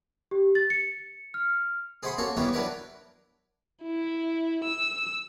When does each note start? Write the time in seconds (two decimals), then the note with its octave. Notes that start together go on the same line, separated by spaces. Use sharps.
0.31 G4
0.55 A6
0.70 C#7
1.34 F6
2.03 G#4 C5 E5 F#5 B5 C6
2.18 A#3 C#4 F#4 A4
2.37 E3 G3 A#3 B3 C#4 E4
2.53 F#3 D4 E4 A#4 B4
3.83 E4
4.64 E6